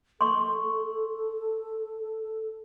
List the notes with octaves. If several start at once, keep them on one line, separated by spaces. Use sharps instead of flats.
A4 C6 C#6